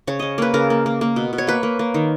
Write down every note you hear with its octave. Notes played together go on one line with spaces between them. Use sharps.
C#3 C#5
C#3 D#5
A#3 B4
C#3 A#4
A#3
A#3
A#3
B2
B2
C#5
A#3 B4
A#3
A#3
D#3